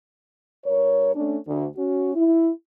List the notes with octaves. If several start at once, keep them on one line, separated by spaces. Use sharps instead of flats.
G2 A#4 C#5
A3 C#4 D4
D2
C#4 F#4
E4